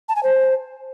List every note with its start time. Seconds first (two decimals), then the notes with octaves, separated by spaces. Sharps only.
0.09 A5
0.16 G#5
0.23 C5